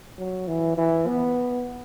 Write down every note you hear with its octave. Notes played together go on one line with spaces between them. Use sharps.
F#3
E3
E3
B3